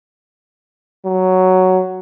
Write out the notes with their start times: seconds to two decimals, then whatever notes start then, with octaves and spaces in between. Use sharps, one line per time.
1.05 F#3